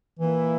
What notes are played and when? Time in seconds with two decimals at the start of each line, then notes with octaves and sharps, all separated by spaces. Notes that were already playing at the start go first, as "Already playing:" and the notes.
0.19 A#2 E3 A#3 E4